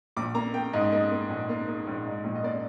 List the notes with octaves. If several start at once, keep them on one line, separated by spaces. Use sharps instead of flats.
A#1 D6
A#3 A#5
A#3 G5
G#2 D#5
A#3 D#5
A#3
A#1
A#3
A#3
A#1
G#2
A#1
D#5
A#3 D5